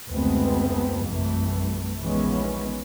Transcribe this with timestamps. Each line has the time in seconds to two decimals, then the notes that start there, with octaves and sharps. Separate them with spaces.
0.12 F#1 D2 G#3 B3 C4
1.06 A#1 F#2 C3 E3 G3 A3
2.00 A#1 D#2 E3 G#3 B3 C#4